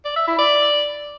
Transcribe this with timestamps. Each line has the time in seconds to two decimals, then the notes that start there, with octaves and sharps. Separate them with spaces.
0.05 D5
0.16 E5
0.27 E4
0.39 D5